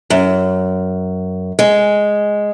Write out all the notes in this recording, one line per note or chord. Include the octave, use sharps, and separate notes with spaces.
F#2
G#3